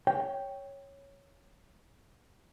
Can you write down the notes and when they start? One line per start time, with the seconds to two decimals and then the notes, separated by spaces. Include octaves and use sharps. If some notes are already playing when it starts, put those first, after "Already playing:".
0.07 C#5 G5